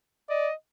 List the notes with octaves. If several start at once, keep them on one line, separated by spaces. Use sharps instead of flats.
D5 D#5